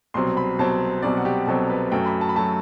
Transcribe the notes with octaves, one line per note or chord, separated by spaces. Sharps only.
C2 B2 F#3 C4 C6
B5
C2 B2 F#3 C4 A5
C2 B2 F#3 C4 D5
F#4
G4
C2 B2 F#3 C4 A4
B4
F#2 F#3 A3 G5
B5
A5
B5
F#3 A3 A5